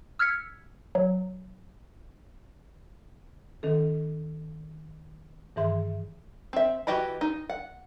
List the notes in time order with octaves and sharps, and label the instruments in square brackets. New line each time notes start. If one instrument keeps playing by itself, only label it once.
[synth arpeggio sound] E6 F6 G#6 B6 C#7
F#3
[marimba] D#3 C#4 A4
G2 D#3 E3 G#4 E5 C6
[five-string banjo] C4 E5
E3 F#4 G4 D#5 B5
D#4
F#5